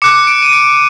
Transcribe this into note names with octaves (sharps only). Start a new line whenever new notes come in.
D6 F#6 C#7
D7
D#7
D7